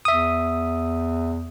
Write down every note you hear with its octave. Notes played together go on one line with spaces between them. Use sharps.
E2 E5 D#6